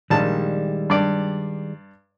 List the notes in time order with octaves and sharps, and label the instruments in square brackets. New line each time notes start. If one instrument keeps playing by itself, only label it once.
[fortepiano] A#1 A5 [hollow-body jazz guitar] D#3 G3 G#3
[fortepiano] G2 D5